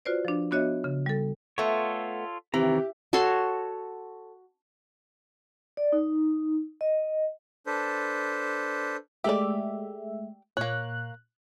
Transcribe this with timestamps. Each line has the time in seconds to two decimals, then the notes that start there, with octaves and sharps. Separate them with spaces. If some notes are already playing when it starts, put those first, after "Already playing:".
0.05 F4 F#4 B4 C5 D5
0.25 F3 D4
0.51 B3 D4 F#4 C#5 D#5 E5
0.84 C#3
1.06 G3 A4
1.58 A3 B3 F4 A4 C#5
2.54 C3 D#3 E3 G4 A#5
3.13 F#4 A4 C#5 C6
5.77 D5
5.92 D#4
6.81 D#5
7.67 D4 A4 B4 C5
9.24 G#3 A3 G4 D5 E5
10.57 A#2 A#3 C#5 F#6